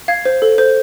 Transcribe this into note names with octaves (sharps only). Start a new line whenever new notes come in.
F5 G#6
C5
A4
C5